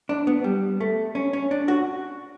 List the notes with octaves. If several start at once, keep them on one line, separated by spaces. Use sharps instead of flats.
D4
B3
G3
A3
C#4
C#4
D4
F#4